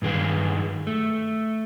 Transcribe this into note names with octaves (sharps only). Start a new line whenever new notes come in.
G2 D#3 G#4 B4 F5
A3